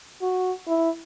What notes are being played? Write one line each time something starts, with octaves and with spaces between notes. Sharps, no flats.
F#4
E4